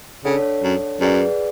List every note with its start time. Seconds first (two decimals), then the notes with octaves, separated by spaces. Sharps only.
0.25 C#3 D4 A4 C#5 F#5
0.63 F#2
1.01 F#2 G#4 B4 D5 F#5